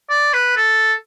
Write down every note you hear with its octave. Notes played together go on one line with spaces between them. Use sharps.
D5
B4
A4